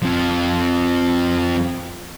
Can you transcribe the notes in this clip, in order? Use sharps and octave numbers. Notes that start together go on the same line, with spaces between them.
F2 F3